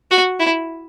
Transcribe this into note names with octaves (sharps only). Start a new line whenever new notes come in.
F#4
E4